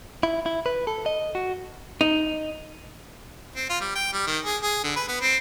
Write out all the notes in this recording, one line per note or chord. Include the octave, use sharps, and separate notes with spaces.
E4
E4
B4
A4
D#5
F#4
D#4
C4
F4
G3
G5
G3
D#3
G#4
G#4
D3
B4
B3
C4